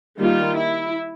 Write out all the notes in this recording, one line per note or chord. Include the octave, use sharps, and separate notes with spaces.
D#3 G3 A#3 F4
E4